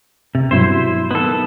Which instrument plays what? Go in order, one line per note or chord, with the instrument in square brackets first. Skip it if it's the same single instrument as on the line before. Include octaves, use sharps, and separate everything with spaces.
[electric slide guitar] C3
[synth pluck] G2 B2 F#3 [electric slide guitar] E4 C5
[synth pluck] D#3 [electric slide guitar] B3 A4